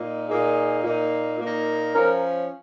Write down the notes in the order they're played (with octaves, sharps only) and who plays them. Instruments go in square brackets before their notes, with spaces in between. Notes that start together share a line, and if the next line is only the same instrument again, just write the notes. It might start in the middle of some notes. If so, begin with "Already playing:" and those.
Already playing: [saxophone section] A#2 A#3 D#4
[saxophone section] A#2 A#3 D#4 [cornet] G#4
[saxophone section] A#2 A#3 D#4
A#2 A#3 D#4
[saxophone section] F3 C#4 [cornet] A#4